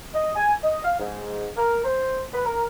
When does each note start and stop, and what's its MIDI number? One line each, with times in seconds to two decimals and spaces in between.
0.14 0.32 75
0.36 0.53 80
0.63 0.79 75
0.84 0.96 77
0.99 1.48 44
1.56 1.83 70
1.85 2.22 72
2.33 2.44 71
2.45 2.66 70